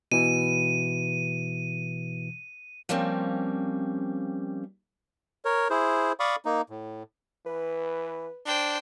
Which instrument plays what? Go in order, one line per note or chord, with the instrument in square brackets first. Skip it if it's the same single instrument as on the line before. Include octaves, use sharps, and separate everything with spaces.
[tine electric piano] B2 E3 [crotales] D#7
[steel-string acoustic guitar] F3 G3 A#3 C4 C#4
[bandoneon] A#4 C#5
E4 G#4 C5
D5 F5 B5 C#6 D#6
A#3 D#4
A2
[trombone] E3 [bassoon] B4
[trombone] D4 [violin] C5 G5